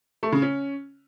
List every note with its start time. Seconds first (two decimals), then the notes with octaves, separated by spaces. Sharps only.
0.23 A3
0.32 C#3
0.42 C#4